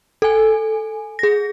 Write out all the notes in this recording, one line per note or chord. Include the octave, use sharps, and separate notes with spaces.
A4 G#5
G#4 A#6